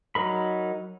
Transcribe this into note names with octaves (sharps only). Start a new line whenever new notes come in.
F#3 D#4 A#4 B5